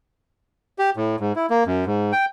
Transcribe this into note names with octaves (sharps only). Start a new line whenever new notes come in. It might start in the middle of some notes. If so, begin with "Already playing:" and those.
G4
A2
G#2
E4
A#3
F#2
G#2
G5